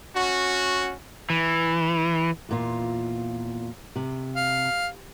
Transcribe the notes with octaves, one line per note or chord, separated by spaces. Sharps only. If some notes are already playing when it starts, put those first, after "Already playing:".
C#4 F#4
E3
E2 A#2 F4
C3
F5